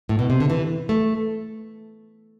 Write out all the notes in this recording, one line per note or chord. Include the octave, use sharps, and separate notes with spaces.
A2
B2
C3
D3
E3
A3